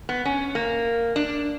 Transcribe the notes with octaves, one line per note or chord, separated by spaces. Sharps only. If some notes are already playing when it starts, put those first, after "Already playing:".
B3
C#4
A#3
D4